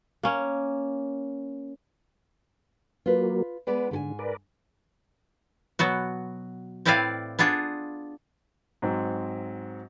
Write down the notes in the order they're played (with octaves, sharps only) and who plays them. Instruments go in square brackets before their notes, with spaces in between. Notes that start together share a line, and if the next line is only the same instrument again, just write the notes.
[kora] A#3 C#4
[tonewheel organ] F#3 A#3 [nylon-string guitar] F4 B4
[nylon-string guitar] G#3 B3 D5 [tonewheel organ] B4
[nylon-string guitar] G#2 A4 G#5 [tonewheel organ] D3
[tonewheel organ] A#4 B4 D5
[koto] B2 F#3 B3 F#4
A2 C4 E4 B4 D5 F5
B3 D4 F4 G#4
[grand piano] G#2 F#3 C4